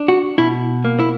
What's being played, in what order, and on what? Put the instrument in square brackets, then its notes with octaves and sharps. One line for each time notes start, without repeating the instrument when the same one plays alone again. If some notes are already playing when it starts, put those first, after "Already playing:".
Already playing: [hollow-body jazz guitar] D4
F#4
B2 E4
A#3
E4